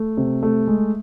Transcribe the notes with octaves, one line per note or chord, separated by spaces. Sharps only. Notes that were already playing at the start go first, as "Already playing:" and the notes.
Already playing: A3
C3
A3
G#3